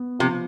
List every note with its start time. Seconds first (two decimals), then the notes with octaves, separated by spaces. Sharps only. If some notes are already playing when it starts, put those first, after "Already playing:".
Already playing: B3
0.19 C3 F3